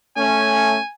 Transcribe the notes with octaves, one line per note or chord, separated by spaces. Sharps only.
A3 C#4 G#5